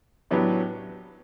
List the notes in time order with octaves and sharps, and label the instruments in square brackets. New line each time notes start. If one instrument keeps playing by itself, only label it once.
[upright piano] A2 F#3 B3 D4 G4